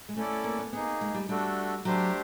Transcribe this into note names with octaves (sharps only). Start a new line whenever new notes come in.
G#3
A3 C#4 E4 A4 D5
A#3
B3
A#3 B3 D#4 G#4
G#3
G3
G3 A3 D4 F#4 A4
F#3 A3 D4 G4 C5